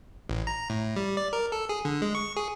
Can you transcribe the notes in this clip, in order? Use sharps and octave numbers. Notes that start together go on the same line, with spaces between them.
A1
A#5
A2
G3
D5
A#4
A4
G#4
D3
G#3
C#6
G#4